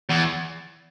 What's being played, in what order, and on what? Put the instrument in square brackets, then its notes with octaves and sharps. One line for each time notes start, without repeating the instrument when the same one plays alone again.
[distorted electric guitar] E2